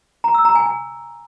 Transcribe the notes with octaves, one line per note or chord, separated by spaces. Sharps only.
A#5
E6
A#5
G#5
G#5